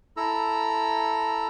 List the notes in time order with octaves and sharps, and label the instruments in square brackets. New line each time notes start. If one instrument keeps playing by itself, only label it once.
[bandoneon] E4 A4 A#5 E6